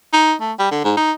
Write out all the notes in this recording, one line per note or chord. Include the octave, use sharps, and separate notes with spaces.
D#4
A3
G3
D3
G#2
D#4